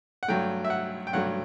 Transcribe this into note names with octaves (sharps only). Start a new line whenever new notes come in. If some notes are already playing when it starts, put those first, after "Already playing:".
F#5
G2 F#3 A3 G5
E5
F#5
G5
G2 F#3 A3 F#5